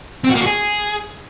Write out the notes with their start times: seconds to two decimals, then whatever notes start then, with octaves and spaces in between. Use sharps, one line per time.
0.24 C4
0.30 F#4
0.35 A#3
0.41 F#4
0.47 G#4